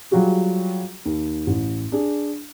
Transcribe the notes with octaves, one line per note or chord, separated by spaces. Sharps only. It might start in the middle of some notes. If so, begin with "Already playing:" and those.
F#3 G3 F4 F#4 G#4
D#2
A1
D4 G#4